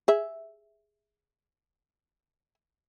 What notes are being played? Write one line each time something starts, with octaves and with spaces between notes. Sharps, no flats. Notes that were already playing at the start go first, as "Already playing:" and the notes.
G#4 E5